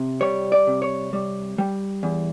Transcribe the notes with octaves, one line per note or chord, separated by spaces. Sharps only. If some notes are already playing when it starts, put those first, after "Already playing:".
Already playing: C3
G3 C#5
D5
C3
C#5
G3
G3
E2